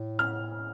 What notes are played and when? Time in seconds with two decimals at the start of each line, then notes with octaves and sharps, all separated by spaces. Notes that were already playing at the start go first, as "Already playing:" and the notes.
Already playing: A2
0.19 F6